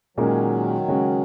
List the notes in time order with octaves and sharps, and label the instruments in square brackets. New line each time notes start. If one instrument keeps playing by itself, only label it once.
[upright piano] A#2 G#3 C#4 F#4 A#4 [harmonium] D#3 F#3
[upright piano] C#3 G#3 C#4 F#4